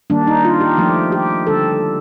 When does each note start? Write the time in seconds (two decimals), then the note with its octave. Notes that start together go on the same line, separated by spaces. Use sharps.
0.10 D#3 G3 A#3 D4
0.27 D#4
0.45 F4
0.61 G4
0.78 F3 A3 D4 G4
1.12 G4
1.46 D3 G3 D4 A4